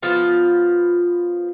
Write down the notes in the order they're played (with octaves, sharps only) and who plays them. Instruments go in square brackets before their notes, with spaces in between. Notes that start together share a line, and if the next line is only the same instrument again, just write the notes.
[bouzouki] F3 B3 F4 A5